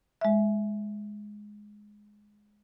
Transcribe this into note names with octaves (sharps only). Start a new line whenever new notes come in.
G#3 E5